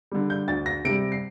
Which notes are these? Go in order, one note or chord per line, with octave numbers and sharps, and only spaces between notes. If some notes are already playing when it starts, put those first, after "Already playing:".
D3 G3
G6
D2 A6
A#6
C3 G3 D7
C7